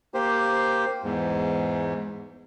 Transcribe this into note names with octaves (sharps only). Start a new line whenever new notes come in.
A#3 G4 C5
E2 G#2